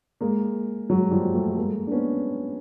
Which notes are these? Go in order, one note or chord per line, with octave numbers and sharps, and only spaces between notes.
G#3 A#3
F#3 G#3
F3 G3
G3 A3
G#3 A#3
D4
B3 C#4